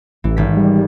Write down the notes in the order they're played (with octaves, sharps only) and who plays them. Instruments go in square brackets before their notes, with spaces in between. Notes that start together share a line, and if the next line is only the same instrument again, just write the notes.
[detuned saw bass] A1 [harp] E3
[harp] G#1 B6
[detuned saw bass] G3